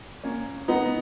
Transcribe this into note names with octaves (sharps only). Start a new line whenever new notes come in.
A#3 C#4
B3 D#4